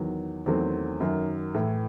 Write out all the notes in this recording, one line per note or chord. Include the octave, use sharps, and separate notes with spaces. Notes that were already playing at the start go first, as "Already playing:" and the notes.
Already playing: E2 D#3 F#3
E2 D#3 F#3 A3 C4
F#2 D#3 F#3
A2 E3 A3